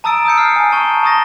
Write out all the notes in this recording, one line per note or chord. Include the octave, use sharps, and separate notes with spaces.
A5 A#5 D#6 E6 A6 D7
D#6 E6 G6 C#7
F6 C7
G#5 A5
A5 A#5 C#6 G6
A5 A#5 C#6 D#6 A6 A#6